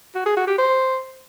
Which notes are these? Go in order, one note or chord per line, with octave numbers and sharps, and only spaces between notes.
F#4
G#4
F#4
G4
C5